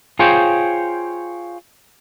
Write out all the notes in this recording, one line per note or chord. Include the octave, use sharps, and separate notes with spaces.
F4 G#4 C5 C#5 G5